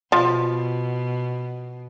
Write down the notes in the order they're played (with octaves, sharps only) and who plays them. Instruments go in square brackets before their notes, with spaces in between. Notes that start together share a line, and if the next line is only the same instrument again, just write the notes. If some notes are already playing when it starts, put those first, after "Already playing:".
[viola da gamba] B2 [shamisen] F3